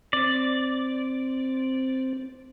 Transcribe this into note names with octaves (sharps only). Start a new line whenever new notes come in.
C4 D5